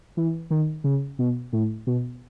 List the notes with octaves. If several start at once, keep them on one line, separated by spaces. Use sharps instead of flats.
E3
D#3
C#3
B2
A2
B2